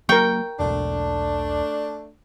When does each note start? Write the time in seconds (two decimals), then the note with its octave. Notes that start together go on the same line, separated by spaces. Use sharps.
0.09 F#3 A#3 A#4 G5 C#6
0.60 E1 B1 A3 D4